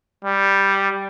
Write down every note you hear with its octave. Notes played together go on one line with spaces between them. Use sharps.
G3